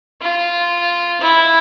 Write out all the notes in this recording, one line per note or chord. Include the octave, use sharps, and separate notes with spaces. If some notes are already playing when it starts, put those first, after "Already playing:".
F4
E4